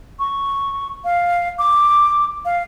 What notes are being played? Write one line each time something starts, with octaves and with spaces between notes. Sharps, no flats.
C#6
F5
D6
F5